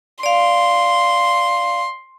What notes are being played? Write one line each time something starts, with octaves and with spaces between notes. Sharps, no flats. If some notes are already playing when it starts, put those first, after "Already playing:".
D5 F5 C6